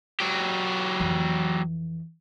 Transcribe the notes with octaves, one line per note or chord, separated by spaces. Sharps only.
F#3 G4
F2 E3